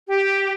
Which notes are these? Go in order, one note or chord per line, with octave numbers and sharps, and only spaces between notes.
G4